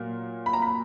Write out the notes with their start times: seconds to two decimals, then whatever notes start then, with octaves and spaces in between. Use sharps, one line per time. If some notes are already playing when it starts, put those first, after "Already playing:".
Already playing: A#2 F#3 A#3
0.46 B5
0.53 A#5
0.62 B5